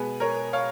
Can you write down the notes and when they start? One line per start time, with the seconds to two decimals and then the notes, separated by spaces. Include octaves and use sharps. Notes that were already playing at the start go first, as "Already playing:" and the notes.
Already playing: B2 G#3 B3 G#4 B4
0.20 A#4 C#5
0.53 C#5 F5